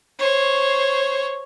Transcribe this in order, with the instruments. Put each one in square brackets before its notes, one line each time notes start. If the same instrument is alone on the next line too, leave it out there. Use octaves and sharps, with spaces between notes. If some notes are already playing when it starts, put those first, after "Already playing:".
[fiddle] C5 C#5